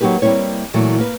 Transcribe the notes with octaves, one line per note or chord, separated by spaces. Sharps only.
F#3 A#3 D#4 G4 B4
G3 A#3 C4 E4 C#5
A#2 E3 F#3 A3
A#3 B4